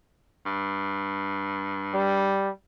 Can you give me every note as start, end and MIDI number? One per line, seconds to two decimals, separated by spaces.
0.45 2.41 43
1.94 2.49 55